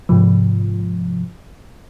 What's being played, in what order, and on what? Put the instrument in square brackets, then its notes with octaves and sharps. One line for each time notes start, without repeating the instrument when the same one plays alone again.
[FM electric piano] G#2 C3 F3